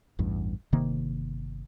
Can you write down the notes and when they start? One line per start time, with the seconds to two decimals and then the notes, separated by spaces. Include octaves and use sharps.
0.19 A1 E2 G2
0.72 G1 C3 D#3 A#3